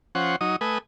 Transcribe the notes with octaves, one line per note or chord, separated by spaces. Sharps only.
F3 C#4 C5 F#5
F#3 D#4 D#6
A3 B4 G#5 D#6